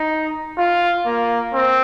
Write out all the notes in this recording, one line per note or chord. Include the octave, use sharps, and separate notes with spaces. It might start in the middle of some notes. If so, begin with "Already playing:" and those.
Already playing: D#4
F4
A#3
C4